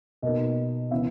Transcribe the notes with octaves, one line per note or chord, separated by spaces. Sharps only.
B2 A#3 D#4 D#5
C#3 E3 B3 E4 E5